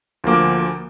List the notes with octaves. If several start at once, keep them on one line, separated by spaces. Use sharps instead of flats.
D2 F3 A#3 D6